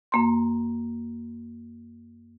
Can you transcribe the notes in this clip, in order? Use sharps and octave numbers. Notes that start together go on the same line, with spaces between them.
F#2 A#3 C6